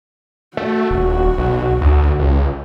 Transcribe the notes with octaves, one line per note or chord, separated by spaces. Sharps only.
A3 F#4
D#1
B1
D2
C#2